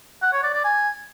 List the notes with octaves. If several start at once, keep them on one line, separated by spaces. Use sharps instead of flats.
F#5
C#5
D5
D5
G#5